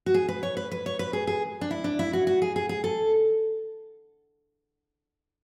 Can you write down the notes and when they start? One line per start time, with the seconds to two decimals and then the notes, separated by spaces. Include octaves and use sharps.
0.06 F#4
0.14 G#4
0.28 B4
0.43 C#5
0.57 B4
0.71 B4
0.86 C#5
0.99 B4
1.13 G#4
1.27 G#4
1.61 D4
1.71 E4
1.84 D4
1.99 E4
2.13 F#4
2.27 F#4
2.42 G#4
2.56 G#4
2.69 G#4
2.84 A4